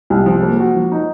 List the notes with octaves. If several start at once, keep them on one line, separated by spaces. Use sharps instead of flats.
C2
F3
A#3
F#4
F3
D#4